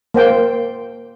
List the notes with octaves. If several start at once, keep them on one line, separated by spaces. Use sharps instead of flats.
A#3 C5 G5